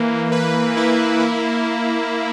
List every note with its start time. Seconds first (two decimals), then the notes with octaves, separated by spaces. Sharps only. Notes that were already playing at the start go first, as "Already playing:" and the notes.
Already playing: E3 A#3
0.32 B4
0.77 E4
1.20 A#3